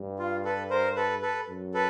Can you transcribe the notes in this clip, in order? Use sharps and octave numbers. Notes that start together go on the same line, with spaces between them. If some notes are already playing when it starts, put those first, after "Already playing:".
Already playing: G2
F4
A4 B4
A#4 C5
A4 B4
A4 B4
F#2
A4 B4